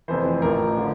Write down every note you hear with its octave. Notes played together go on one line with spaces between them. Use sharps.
F1 F2 E3 C5
A1 A2 F3 A3 A#4
D3 F3